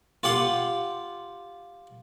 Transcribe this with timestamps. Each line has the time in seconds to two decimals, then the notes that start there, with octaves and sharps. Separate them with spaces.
0.23 F4 G4 F#5 C6